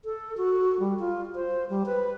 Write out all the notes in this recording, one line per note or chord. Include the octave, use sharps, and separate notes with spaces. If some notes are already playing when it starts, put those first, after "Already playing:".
A4
F#4
G3
F4
C5
G3
B4